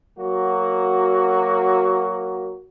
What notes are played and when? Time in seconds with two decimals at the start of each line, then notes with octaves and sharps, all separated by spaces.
0.19 F#3 A#3 F#4